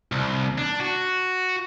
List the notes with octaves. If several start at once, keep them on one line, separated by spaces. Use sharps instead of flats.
C2
D4
F#4